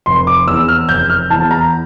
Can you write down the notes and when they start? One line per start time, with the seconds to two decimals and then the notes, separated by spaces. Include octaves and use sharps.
0.06 F1 C6
0.27 D6
0.47 E2 E3 E6
0.68 F6
0.89 F1 G6
1.10 F6
1.30 E2 E3 A5
1.51 A#5